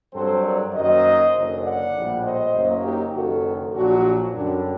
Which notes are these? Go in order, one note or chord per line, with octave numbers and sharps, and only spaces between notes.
G2 F#3 C4 A4 C5
A#4 D5
F#2 D#3 F#3 A#3 C5 D#5
F#1 F#2 D3
D5 F#5
A#1 A2 G3
C5 D#5
F#1 F#2 F#3 A#3
D#4 G4
F#1 F#2 D#3 F#3 F#4 A4
A#1 A#2 F#3 D4 F#4
F#2 D3 G3 D4